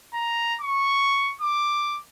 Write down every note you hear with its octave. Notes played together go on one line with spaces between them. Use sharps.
A#5
C#6
D6